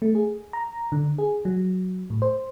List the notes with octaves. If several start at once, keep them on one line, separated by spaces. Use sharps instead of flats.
A3
G#4
A#5
D3
G#4
F#3
A2
C5